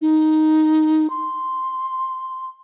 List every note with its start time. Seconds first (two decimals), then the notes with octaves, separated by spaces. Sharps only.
0.02 D#4
1.10 C6